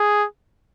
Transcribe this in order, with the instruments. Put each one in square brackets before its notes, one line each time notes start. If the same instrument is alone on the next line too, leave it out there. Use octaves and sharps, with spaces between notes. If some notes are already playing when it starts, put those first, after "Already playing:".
Already playing: [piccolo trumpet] G#4